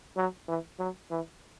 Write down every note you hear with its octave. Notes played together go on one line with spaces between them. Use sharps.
F#3
E3
F#3
E3